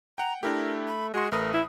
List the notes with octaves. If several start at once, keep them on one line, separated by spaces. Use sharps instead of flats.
F#5 G5 A#5
A3 D4 E4 G4 A#4
B5
G#3 F#4 D#5 C6
A1 A3 A#4 B4 D#6
E4 B5